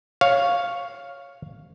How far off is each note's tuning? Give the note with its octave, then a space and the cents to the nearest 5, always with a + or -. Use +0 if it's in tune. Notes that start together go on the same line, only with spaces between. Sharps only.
C#5 +0 F5 +0